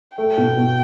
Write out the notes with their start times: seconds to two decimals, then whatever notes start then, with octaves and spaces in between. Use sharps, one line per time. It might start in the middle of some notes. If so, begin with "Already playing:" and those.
0.18 A3 G5
0.37 B2
0.57 B2